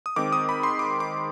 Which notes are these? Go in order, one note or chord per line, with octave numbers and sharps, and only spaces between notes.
D#6
D#3 G#3 C4 D6
D#6
B5
C6
D6
D6